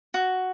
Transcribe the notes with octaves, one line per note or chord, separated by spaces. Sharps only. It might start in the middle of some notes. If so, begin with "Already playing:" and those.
F#4